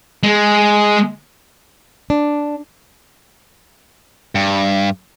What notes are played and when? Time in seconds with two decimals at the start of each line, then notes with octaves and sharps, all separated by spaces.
0.23 G#3
2.10 D4
4.35 G2